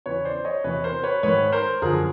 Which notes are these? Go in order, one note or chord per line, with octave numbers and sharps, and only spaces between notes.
E2 C#3 E3 B4 C#5
C5 D5
C#5 D#5
E2 C3 E3 B4 C#5
A#4 C5
B4 C#5
G#2 D#3 B4 C#5
A#4 C5
F#2 D3 F3 G#4 A#4